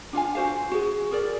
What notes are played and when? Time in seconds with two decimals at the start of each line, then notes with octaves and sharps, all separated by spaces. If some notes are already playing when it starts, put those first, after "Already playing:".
0.13 D4 F4 F5 G#5
0.35 F#4 C5 F5
0.72 F#4 G#4
1.11 G#4 A#4 D5